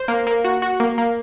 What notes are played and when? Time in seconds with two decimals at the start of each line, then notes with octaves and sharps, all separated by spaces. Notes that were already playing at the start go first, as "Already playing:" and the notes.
Already playing: C5
0.08 A#3
0.27 A#3
0.44 F#4
0.62 F#4
0.80 A#3
0.98 A#3